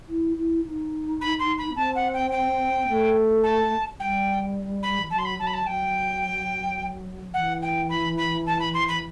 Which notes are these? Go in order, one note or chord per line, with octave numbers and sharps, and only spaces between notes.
E4
E4
D#4
B5
C6
B5
B3
C4 A5
F#5
G5
G5
A3
A5
G3 G5
B5
E3
F#3 A5
C6
B5
F#3 A5
B5
A5
F#3 G5
E3 F#5
G5
B5
B5
A5
B5
C6
B5